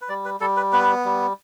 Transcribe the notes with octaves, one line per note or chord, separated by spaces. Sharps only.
B4
G3 D5
B4
G3 A4
B4
B3 B4
G3